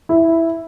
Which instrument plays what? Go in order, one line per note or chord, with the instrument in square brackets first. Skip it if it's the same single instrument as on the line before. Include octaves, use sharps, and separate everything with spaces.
[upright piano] E4